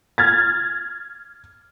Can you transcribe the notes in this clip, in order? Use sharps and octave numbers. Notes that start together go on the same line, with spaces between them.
F6 G#6 A6